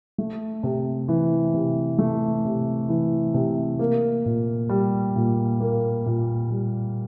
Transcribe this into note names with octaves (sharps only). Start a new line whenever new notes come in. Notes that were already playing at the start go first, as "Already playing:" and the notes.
A3
C3
E3
C3
A3
C3
E3
C3
A#3
A#2
G3
A#2
A#3
A#2
G3